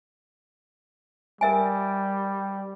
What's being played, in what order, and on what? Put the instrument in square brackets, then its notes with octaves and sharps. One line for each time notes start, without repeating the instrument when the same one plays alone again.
[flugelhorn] G3 [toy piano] A#4 E5 G#5